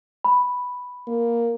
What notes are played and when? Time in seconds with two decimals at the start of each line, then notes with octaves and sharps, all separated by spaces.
0.24 B5
1.07 A#3